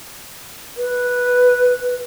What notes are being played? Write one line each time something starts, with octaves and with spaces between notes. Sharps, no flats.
B4